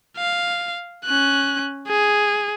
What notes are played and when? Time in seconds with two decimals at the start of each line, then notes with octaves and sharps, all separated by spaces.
0.17 F5
1.06 C#4 F#6
1.88 G#4